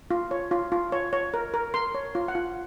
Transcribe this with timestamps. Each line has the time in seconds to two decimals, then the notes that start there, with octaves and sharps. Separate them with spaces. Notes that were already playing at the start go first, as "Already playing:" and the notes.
0.11 F4
0.31 C#5
0.51 F4
0.72 F4
0.92 C#5
1.13 C#5
1.34 A#4
1.54 A#4
1.74 A#4 C6
1.95 C#5
2.15 F4
2.28 F#5
2.35 F4